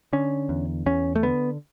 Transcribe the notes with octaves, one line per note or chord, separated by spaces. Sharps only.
D3 C#4
E2
E2 C#4
A3
D3 B3